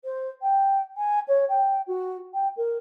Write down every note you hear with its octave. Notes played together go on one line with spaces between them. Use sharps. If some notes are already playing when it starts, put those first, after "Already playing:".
C5
G5
G#5
C#5
G5
F#4
G5
A#4